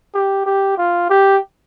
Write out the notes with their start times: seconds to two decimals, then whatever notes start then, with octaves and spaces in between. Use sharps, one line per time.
0.15 G4
0.46 G4
0.78 F4
1.10 G4